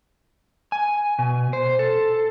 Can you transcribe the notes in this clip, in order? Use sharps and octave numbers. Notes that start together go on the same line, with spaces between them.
G#5
B2
C5
A4